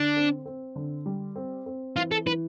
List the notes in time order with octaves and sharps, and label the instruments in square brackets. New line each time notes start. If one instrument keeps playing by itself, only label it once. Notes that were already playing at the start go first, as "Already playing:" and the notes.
Already playing: [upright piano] D3 [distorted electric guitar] D4
[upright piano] C4
C4
D3
G3
C4
C4
[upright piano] E3 [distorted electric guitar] F4
[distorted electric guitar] A4
[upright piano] E3 [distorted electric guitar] B4